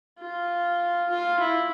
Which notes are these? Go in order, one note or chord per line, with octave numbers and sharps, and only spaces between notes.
F4
F4
E4